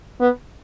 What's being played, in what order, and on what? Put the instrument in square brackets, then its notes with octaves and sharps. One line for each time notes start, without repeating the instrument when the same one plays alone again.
[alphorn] B3